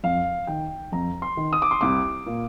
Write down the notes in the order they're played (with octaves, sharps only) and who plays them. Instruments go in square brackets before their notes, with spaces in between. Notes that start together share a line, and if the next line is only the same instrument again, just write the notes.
[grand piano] F2 F5
D#3 G5
F2 A#5
C6
D#3
D#6
D6
C6
C2 D6
A#2